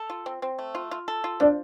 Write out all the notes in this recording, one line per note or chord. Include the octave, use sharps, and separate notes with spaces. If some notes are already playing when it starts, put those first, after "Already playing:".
Already playing: A4
F4
C4
C4
A3
F4
F4
A4
F4
F3 D4